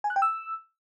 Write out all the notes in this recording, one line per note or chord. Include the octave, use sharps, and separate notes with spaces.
G#5
F#6
G5
E6